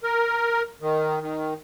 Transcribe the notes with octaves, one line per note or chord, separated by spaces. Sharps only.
A#4
D#3
D#3